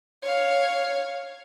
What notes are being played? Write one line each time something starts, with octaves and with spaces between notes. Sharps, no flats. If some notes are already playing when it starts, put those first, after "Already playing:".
C#5 F5